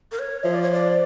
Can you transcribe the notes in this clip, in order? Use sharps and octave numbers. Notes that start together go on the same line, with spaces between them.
A#4
C#5
F3 E5
D5
C#5
D5